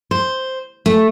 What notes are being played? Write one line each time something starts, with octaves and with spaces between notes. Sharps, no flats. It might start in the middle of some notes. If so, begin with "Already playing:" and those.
C5
A3